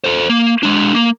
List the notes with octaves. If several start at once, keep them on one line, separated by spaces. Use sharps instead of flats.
A4 C5
A#3
G#3 D4
A#3